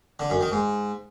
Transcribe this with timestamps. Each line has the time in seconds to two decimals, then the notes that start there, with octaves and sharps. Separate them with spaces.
0.19 D3
0.30 F#2
0.41 D#3
0.52 G#2